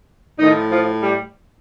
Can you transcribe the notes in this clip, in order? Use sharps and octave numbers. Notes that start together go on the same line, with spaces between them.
A2 D#3 F3 D#4
F3 F4
G3 G4